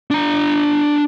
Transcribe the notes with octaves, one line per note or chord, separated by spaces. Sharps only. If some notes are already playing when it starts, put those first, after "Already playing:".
D4 A#5